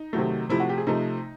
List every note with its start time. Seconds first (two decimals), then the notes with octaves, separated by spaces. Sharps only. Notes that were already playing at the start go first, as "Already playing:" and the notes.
Already playing: D#4
0.13 C3 D#3 F#3 A3
0.49 C3 F3 A3 E4
0.60 F#4
0.69 G4
0.78 G#4
0.87 C3 F3 A3 D#4